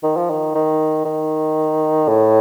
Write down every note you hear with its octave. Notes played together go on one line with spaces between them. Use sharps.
D#3
F3
D#3
D#3
D#3
A2